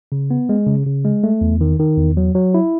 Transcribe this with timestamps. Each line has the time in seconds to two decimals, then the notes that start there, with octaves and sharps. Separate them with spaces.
0.12 C#3
0.31 B3
0.49 G#3
0.67 C#3
0.86 C#3
1.05 G#3
1.24 A3
1.41 E2
1.61 D#3
1.79 D#3
1.98 E2
2.17 F#3
2.35 F#3
2.54 E4